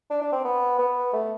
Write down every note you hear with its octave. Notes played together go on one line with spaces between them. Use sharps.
D4
D4
C4
B3
B3
A3